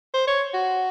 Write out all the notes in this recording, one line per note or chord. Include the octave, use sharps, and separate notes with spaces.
C5
C#5
F#4